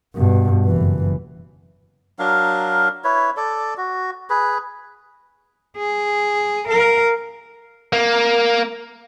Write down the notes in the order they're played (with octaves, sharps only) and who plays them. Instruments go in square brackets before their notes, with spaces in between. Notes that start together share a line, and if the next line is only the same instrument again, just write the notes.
[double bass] G2 B2
F#1 E3
[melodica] F#3 D4 A#4 F5
E4 B4 C#5
A4 D5
F#4
G#4 B4
[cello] G#4
A#4 F5
[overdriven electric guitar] A#3